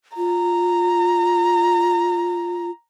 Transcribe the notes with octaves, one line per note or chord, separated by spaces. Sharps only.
F4 A#5